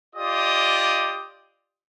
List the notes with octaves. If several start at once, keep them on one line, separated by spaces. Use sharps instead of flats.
F4 G4 D5 D#5 D#6